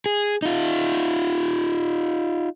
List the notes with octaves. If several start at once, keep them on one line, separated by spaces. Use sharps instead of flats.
G#4
D#4 F4